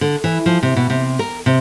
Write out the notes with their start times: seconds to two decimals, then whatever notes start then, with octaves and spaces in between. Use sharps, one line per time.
0.01 D3
0.24 E3
0.46 F3
0.63 C3
0.76 B2
0.90 C3
1.19 A#4
1.46 C3